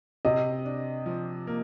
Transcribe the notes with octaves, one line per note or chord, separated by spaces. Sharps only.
C3 D#5
D4
F3
A#3